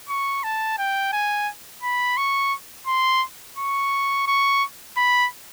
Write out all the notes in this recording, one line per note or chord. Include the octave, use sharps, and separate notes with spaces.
C#6
A5
G5
G#5
B5
C#6
C6
C#6
C#6
B5